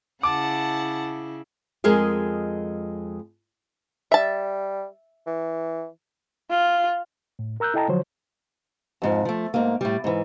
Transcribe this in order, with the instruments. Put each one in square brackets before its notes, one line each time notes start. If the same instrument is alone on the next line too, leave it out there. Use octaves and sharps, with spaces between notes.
[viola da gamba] C#3 E4 [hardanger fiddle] F#5 A5 [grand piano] D6
[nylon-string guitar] F2 G#3 G#4 A#4 D#5
[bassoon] G3 [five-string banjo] E5 A5
[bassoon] E3
[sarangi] F4
[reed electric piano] A2
A#4 A#5 E6 F#6 G6
E4 A4 D#5 G5 A5 A#5
D3 F3 F#3 C5 C#5
[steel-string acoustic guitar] F2 G#2 F3
F3 A3
G#2 A#3
A2 G3
G#2 E3